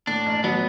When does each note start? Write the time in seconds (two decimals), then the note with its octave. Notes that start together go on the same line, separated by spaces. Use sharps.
0.07 A2 D4
0.26 A1
0.44 F#3 B3